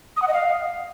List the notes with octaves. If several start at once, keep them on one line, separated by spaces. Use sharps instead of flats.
D#6
F#5
D#5
F5